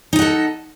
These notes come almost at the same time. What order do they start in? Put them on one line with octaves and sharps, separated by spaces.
D#4 D#5 F#5 A4